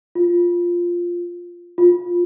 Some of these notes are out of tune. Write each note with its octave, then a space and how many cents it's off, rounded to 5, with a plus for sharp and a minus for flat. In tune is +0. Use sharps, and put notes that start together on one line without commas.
F4 +0
F4 +10